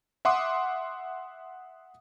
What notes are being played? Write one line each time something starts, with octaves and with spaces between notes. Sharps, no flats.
E5 F#5 C6 D6 D#6